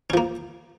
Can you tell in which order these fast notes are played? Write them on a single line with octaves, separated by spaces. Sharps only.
C#4 F3 A#3